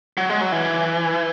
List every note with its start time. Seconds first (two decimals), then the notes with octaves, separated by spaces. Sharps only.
0.17 F#3
0.30 G#3
0.41 F#3
0.52 E3